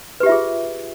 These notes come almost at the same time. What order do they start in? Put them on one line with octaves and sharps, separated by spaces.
B4 G4 E5 F4 G#4